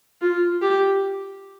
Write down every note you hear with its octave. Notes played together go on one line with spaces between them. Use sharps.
F4
G4